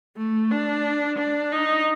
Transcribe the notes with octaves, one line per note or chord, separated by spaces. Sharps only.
A3
D4
D4
D#4